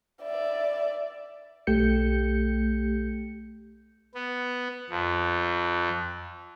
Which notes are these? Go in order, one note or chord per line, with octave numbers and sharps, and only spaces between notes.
D5 E5
B1 A3 G4 G6 C#7
B3
F2